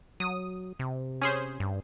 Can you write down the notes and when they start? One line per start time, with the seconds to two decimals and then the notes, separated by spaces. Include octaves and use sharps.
0.20 F#3 D#6
0.79 C3
1.22 C#4 G#4 C5
1.60 G2